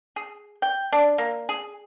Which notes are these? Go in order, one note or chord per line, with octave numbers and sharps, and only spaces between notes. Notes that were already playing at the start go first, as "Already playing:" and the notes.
G#4
G5
D4
A#3
G#4